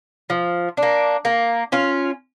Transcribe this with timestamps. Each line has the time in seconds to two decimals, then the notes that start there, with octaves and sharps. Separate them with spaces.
0.30 F3
0.77 D4
0.83 A#3
1.25 A#3
1.72 C#4 F4